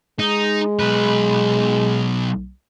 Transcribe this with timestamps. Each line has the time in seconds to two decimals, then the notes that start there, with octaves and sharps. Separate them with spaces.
0.19 G#3 D#4
0.79 B1 B4